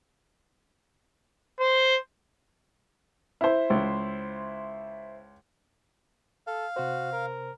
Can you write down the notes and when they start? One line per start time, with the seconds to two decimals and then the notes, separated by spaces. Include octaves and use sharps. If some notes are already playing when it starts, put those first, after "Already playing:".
1.60 C5
3.41 E4 C5
3.70 C#2
6.47 A4 F5
6.76 C3 F#4 C5
7.12 A#4